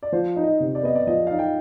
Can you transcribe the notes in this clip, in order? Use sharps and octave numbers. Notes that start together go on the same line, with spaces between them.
D5
F3 C5
D#4
D#5
C3
D5
B3 D#5
D5
F3 D#5
D#4 F5
G5